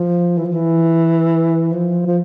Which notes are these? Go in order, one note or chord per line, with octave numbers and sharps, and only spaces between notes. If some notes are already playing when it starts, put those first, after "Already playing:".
Already playing: F3
E3
F3
E3
F3
F3